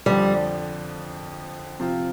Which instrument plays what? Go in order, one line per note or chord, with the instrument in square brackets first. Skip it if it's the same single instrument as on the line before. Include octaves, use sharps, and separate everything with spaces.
[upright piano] F2 D3 F3 [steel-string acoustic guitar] G3
[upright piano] C3 F3 C4 F4